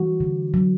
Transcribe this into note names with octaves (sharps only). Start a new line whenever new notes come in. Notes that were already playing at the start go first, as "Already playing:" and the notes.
Already playing: E3 G3 F#4
D3
F#3